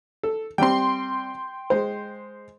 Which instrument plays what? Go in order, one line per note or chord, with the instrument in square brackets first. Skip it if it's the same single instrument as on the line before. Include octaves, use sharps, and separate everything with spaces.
[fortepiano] A4
[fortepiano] G3 C4 [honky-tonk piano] G5 C6
[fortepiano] G#3 C5